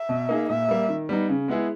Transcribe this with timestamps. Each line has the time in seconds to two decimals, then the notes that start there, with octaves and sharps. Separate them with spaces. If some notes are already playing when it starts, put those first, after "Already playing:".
Already playing: E5
0.09 B2
0.29 A#3 D#4 G#4
0.49 A#2 E5
0.69 G3 A#3
0.89 D#3
1.09 G3 B3 D#4
1.29 C#3
1.48 G#3 B3 E4 G#4